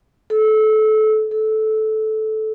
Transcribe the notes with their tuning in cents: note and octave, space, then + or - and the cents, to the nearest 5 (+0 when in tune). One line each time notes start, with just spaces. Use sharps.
A4 -25
A4 -15